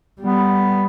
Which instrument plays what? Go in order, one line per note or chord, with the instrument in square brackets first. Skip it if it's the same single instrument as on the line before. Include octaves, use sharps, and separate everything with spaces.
[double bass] G3 [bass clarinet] B3